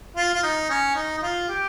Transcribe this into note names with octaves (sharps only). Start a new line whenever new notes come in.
F4
F4
D#4
C#4
D#4
D#4
F4
G4